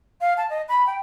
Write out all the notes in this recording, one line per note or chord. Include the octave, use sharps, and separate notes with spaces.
F5
A5
D#5
B5
G5